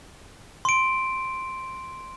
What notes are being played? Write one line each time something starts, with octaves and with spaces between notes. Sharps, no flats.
C6 D7